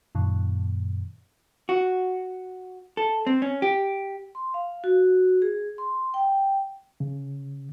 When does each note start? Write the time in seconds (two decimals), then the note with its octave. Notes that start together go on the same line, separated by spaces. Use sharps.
0.15 F#2 A#2 D#3
1.69 F#4
2.97 A4
3.27 C4
3.42 C#4
3.62 G4
4.35 C6
4.54 F5
4.84 F#4
5.42 G#4
5.78 C6
6.14 G5
7.00 C#3